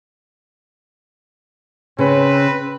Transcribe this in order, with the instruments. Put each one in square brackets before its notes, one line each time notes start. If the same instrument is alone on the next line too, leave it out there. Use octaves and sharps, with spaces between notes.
[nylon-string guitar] C#3 [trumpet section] C4 B4